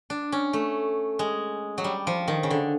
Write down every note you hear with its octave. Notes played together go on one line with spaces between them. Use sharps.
D4
C#4
A3
G#3
F#3
G3
F3
D#3
C#3
D3